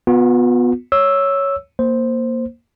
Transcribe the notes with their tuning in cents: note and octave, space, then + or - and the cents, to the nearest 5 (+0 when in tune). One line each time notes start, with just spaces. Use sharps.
B3 +0 F4 +45
C#5 +0 E6 +0
A#3 +0 C5 +0